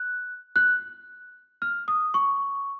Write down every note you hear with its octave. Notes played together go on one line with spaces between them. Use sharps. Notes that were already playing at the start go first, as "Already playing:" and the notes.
Already playing: F#6
F#6
F6
D#6
C#6